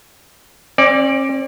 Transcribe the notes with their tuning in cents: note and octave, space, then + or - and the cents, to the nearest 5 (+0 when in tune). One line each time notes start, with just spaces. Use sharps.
C#4 -45 D5 +0